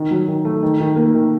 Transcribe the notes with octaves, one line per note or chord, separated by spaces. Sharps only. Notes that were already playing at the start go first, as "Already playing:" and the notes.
Already playing: D#3
F#3
D#3
A3
D#3
D#3
A#3
D#3